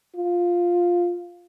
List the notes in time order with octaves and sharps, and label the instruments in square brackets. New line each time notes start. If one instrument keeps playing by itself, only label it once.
[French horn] F4